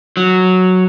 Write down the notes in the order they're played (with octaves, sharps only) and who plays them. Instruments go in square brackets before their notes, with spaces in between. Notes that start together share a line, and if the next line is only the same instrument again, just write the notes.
[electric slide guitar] F#3